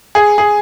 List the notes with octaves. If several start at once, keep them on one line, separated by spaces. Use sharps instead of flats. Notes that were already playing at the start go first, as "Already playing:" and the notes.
G#4
G#4